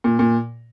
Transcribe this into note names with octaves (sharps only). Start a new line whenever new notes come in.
A#2
A#2